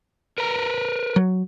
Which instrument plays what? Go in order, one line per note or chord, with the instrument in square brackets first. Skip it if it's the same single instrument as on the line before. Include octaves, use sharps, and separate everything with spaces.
[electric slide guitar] A#4 B4 A#5
[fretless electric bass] F#3